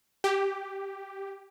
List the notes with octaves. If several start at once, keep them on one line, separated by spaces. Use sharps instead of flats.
G4